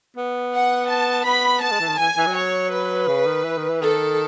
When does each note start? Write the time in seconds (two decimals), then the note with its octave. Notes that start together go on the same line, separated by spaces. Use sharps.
0.16 B3
0.53 F#5
0.89 A5
1.25 B3 B5
1.62 B3 A5
1.71 G#3
1.81 E3
1.89 D#3
1.98 E3 G#5
2.17 E3
2.27 F#3
2.35 C#5
2.72 B4
3.08 C#3
3.26 D#3
3.44 E3
3.57 D#3
3.69 E3
3.81 D#3 A4